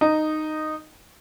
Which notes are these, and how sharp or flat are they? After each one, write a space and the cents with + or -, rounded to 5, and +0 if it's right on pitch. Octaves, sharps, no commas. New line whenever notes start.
D#4 -10